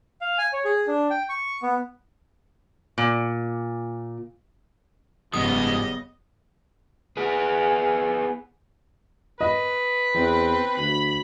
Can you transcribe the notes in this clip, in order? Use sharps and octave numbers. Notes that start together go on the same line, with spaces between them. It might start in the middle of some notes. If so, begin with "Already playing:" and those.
F5
G#5
C#5
G#4
D4
G5
C#6
B3
A#2
F#1 G#2 C#3 F3 G3 B3 D#5 D#6
B3 G#4
B4 D#5
E2 C4
D2 B5